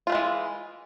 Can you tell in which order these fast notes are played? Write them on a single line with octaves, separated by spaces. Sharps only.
F4 A3 G#3 E3